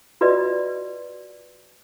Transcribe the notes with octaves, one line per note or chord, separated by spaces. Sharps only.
F4 F#4 B4 D5 D#5